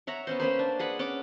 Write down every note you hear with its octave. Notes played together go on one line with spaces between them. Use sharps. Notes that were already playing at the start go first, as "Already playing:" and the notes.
C#5 E5 F#5 A#5
B3 C#4 C5
A#3 C#4 B4 C5
D4
G#4 B4 F#5 B5
C#4 D5 F#5 D6